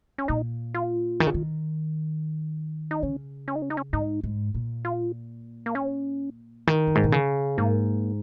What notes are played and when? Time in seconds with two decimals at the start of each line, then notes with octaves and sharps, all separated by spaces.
0.18 C#4
0.28 A#2 D#4
0.74 F4
1.20 D#3
1.27 C#3
1.34 D#3
2.91 D#4
3.03 C#3 C#4
3.48 C#4
3.56 D#4
3.62 C#4
3.70 D#4
3.77 C#4
3.93 G#2 D#4
4.24 G#2
4.54 A#2
4.85 F4
5.66 A#3
5.75 C#4
6.67 D#3
6.87 F2
6.95 G#2
7.04 A#2
7.12 C#3
7.57 G#2 A#3